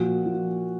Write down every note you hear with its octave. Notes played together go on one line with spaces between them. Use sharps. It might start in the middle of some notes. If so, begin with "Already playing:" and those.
Already playing: A#2 F3 F#4
F3